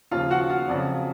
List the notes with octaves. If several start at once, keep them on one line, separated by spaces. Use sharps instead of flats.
D#2 C#3 F3 F4 F5
F#4 F#5
F4 F5
F2 C#3 F#3 D5